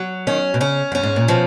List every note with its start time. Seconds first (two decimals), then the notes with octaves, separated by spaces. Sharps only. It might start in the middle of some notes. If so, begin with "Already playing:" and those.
Already playing: F#3
0.27 D#3 C#4
0.54 B2
0.61 C#3 C#4
0.92 F#2 C#4
1.03 G#2
1.16 A#2
1.28 B2 F3